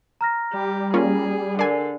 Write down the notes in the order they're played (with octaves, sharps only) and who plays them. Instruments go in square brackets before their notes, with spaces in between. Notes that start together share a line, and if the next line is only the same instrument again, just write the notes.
[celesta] A#5 F6 A#6
[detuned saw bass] G3 [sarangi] G4
[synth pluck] A#3 C#4 F4 [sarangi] G#4
[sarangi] D3 [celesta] A#4 C7 [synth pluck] D5 G#5